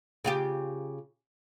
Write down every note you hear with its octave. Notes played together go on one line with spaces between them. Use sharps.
C#3 F4 G4